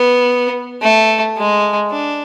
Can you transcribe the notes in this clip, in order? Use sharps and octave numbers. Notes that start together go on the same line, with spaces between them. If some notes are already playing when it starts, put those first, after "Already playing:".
Already playing: B3
A3
G#3
D4